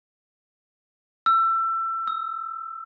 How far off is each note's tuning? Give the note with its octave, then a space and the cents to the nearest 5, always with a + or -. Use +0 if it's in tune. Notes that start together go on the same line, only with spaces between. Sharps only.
E6 +25
E6 -30